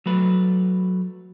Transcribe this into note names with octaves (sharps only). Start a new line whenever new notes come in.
F#3 A3 B4